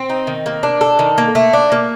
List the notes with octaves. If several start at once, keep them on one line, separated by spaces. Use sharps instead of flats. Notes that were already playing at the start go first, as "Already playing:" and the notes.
Already playing: C4
D#4
D#3
A#3
D4
A4
D#3
A#3
A3
D4
A#3